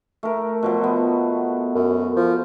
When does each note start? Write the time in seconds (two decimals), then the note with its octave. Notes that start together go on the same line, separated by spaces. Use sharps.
0.23 A3 A#4
0.63 B2 F3 F#3
0.84 B3
1.75 F#2
2.16 F3